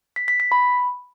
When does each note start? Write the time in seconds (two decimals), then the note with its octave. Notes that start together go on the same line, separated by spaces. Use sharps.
0.16 B6
0.28 B6
0.40 B6
0.52 B5